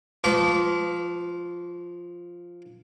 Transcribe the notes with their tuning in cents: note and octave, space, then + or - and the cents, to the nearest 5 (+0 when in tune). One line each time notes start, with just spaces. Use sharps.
F3 +0 B4 +45 D6 -35